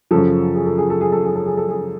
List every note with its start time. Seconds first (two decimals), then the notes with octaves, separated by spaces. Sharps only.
0.11 F#2 C#3 F3 A4
0.55 G#4
0.66 A4
0.78 G#4
0.90 A4
1.01 G#4
1.12 A4
1.24 G#4
1.36 A4
1.46 G#4
1.57 A4
1.69 G#4